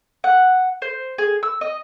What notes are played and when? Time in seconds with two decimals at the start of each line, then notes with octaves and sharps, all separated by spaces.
0.24 F#5
0.82 C5
1.18 G#4
1.43 E6
1.61 D#5